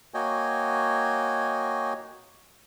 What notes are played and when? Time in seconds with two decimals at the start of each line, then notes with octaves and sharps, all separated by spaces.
0.14 A#3 F#4 C#5 D#5 G5 G#5